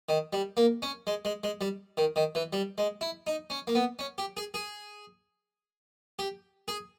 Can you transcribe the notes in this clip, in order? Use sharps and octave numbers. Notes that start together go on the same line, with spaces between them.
D#3
G3
A#3
C#4
G#3
G#3
G#3
G3
D#3
D#3
E3
G3
G#3
E4
D#4
C#4
A#3
B3
C#4
G4
G#4
G#4
G4
G#4